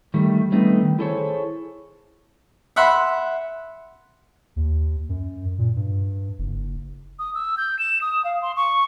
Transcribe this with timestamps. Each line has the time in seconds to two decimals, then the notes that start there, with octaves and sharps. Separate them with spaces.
0.14 D#3 G3 A3
0.52 G3 A3 B3 C4 D#4
0.83 D#3
0.99 E4 G#4 A4 C5 C#5
2.76 E5 F#5 B5 C6
4.56 D#2
5.09 F#2
5.58 A#2
5.76 G2
6.39 F#1
7.19 D#6
7.35 E6
7.57 G6
7.79 E7
8.01 D#6
8.24 F5
8.42 C6
8.56 C#6